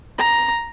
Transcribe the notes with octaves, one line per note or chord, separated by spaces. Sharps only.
A#5